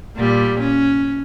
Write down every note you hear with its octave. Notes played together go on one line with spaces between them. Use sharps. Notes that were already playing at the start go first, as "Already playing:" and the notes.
A#2 G3
C#4